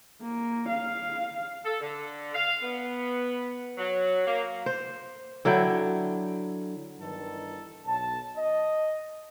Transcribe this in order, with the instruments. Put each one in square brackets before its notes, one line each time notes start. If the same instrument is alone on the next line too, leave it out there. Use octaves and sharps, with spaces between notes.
[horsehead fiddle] A#3
F5
[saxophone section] A4
D3
F5
B3
F#3
A#3
[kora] C5
D3 F#3 E4 G5
[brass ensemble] G1 G2 D#3 E3 A4
B1 A5
D#5